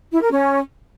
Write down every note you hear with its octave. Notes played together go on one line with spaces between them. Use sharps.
E4
A#4
C#4